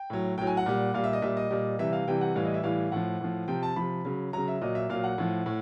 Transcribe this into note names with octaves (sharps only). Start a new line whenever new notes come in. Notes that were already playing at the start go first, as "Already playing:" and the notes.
Already playing: G5
A2 F#3
A2 F#3 G5
G#5
F#5
A#2 G3
A#2 G3 F5
E5
D#5
A#2 G3 E5
D#5
A#2 G3
C3 E3 G3 E5
F5
C3 E3 G3 G5
F#5
A2 E3 G3 F5
D#5
E5
A2 E3 G3 F5
A2 F3 F#5
A2 F3
C3 F3 G5
A5
C3 F3 B5
C#3 F#3
C#3 F#3 A#5
E5
A#2 F#3 D#5
E5
A#2 F#3 F5
F#5
A2 F3
A2